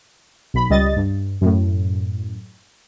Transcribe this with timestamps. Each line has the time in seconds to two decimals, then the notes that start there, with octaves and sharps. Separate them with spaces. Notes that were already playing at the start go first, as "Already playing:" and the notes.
0.54 B1 B5
0.70 C#2 G3 D#5 A6
0.96 G2
1.41 F#2 A2